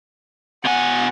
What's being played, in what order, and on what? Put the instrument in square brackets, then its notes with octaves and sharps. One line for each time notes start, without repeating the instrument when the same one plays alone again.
[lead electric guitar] B2 G#5 [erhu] F#5